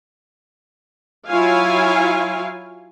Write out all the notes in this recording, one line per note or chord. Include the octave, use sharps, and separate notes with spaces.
F#3 E4 F4 C#5 F5 G#5